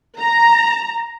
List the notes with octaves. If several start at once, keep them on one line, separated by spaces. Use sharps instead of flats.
A#5